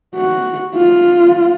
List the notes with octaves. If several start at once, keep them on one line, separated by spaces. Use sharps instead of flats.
F#4
F4